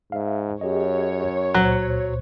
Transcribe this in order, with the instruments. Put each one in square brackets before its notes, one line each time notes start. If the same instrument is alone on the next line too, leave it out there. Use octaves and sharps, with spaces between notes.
[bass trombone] G#2 [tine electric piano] E5 F5
[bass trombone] F#2 [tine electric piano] G4 G#4 D#5 [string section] C#5
[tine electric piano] C#2 A#2 C5 [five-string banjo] F#3